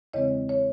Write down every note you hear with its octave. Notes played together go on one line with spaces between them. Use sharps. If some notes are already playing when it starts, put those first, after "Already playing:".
E2 C#3 E3 G#3 C4 C#5 D#5
C#5